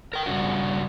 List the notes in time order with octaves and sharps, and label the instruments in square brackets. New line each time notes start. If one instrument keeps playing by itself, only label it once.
[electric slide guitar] A#4 G5
G2 C#3 D4 F#4